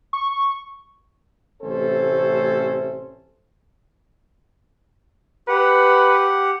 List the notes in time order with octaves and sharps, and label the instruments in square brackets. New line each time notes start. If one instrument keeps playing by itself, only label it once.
[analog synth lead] C#6
[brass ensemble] A1 C3 A3 C#4 A4 C5
[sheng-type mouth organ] G4 F#5 [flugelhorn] B4